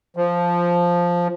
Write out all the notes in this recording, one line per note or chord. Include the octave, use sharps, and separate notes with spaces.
F3